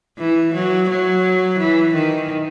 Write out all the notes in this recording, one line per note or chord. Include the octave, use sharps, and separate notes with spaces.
E3
F#3
F#3
E3
D#3